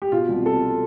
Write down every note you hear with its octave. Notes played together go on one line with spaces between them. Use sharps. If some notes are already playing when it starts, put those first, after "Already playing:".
G4
B2 F4
C2
B2 A4